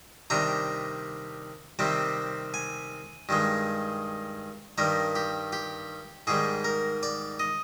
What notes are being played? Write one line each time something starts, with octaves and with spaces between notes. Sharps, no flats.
C3 D#3 G3 D4 A#5
C3 D#3 G3 C4
G#5
G2 D#3 G#3
G2 D#3 G3 A#4
G4
G4
G#2 D#3 G3 G#4
A#4
D5
D#5